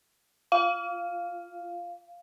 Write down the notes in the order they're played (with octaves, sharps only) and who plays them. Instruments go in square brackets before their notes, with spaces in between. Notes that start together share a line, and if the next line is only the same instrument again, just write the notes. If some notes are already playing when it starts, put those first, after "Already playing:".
[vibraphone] F4 [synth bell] F5